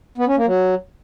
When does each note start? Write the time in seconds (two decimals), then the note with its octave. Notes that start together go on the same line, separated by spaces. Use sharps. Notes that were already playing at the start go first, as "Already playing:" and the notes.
0.18 B3
0.27 C#4
0.36 A#3
0.46 F#3